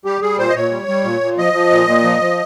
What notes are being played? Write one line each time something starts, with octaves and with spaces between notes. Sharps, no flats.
G3 G4
G3 G#4
A#2 C5
D#5
A#2 C#5
G3
G3
A#2
A#2
F3 D#5
F3
A#2
A#2
F3
F3